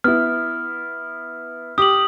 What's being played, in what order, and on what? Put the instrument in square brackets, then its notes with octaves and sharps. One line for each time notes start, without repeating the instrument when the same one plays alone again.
[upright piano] B3 E4 [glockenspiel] F6
[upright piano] G4 [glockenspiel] D#6 F#7